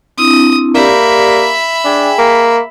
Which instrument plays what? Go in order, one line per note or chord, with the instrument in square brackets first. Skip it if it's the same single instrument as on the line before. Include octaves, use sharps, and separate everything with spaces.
[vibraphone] C4 D4 E4 [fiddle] D#6
[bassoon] A#3 [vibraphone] G4 D5 [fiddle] E5 B5
[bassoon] D4 [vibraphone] G#4 G5 G#5
[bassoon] A#3